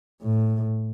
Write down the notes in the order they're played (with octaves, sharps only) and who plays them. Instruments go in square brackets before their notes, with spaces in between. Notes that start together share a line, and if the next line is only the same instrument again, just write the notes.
[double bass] A2